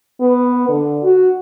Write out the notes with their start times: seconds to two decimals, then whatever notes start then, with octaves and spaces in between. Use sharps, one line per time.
0.20 B3
0.69 D3
1.03 F#4